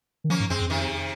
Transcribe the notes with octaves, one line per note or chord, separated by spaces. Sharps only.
D#3
F3 A#3 C#4
G#2
F#2 G#3 C4
F2
C3 D#3